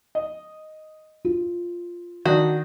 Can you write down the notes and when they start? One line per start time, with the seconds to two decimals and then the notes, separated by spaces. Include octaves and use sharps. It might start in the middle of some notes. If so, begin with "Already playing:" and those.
0.15 D#5
1.25 F4
2.25 D#3 D4 F#4